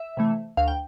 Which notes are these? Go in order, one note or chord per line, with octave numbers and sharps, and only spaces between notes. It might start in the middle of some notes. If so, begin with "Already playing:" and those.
Already playing: E5
C3 E3 A3
D2 F5
G5